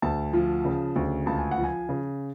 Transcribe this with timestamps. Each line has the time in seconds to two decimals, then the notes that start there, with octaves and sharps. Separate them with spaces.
0.02 D2 A5
0.33 F3
0.65 C#3
0.96 D2
1.26 C#2 A5
1.38 G#5
1.51 F#5
1.58 F3
1.63 G#5
1.89 C#3